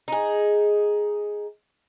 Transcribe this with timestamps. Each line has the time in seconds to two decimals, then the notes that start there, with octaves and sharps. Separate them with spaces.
0.08 D#4 G#4